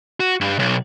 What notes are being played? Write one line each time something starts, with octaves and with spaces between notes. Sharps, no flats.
F#4
G2
B1